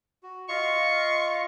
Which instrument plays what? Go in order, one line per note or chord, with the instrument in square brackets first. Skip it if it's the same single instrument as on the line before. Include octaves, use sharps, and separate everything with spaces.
[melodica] F#4
[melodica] F4 D#5 F5 [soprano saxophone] C#6